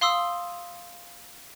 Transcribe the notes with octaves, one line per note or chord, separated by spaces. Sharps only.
F5 C6 D#6 E6